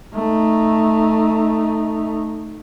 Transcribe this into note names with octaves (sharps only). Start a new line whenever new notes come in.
A3 D#4